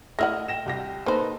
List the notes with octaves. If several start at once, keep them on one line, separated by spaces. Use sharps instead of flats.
A3 E4 D#5 F#5 F6 A#6
G5 A#6 E7
C2 G4 A#6
A#3 D#4 A4 B4 C5